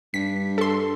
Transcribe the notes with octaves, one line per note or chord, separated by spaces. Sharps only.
G2 B6
A4 C6